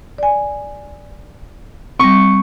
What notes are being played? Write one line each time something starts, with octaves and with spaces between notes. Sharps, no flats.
D5 G#5
G3 C4 C#6